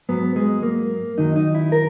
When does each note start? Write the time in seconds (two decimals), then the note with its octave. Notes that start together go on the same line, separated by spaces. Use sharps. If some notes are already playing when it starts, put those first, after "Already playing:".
0.09 G#2 F#3 B3
0.36 G#3
0.63 A#3
1.18 F#2 D#3 F#3 D#4
1.36 D#4
1.55 E4
1.72 A#4